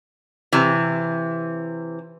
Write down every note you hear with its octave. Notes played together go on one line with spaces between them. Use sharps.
C3 E3